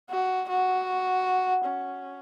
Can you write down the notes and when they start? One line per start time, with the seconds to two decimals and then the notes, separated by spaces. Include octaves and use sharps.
0.10 F#4
0.49 F#4
1.66 C#4